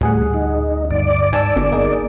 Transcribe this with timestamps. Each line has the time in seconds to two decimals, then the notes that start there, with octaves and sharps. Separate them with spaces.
0.01 D2 A2 G3 G#4 F#5
0.34 D#4
0.91 G1 D5
1.33 G#2 G#5 A5 E6
1.56 G1 B2 D3
1.72 A#3 D#4 G#4